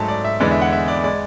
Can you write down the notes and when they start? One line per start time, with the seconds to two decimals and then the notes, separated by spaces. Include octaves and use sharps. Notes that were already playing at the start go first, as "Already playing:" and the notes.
Already playing: G#2 F#3 A3 A5
0.08 D5
0.24 E5
0.40 E2 D3 G#3 D5
0.51 E5
0.62 F#5
0.72 E5
0.88 D5
1.04 G#3 D5